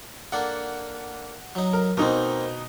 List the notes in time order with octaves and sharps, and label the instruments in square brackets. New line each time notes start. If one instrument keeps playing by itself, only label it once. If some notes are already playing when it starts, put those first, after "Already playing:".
[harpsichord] A#3 D4 A4 [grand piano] F#5
[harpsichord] F#3 D#4
[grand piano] A#4
[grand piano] B2 D#4 [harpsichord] A#3 C4